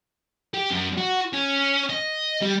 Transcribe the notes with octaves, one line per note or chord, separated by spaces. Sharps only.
G4
F#2
F#4
C#4
D#5
G3